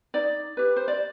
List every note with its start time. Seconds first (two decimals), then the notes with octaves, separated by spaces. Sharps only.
0.14 D#4 D5
0.57 G4 B4
0.76 C5
0.88 D5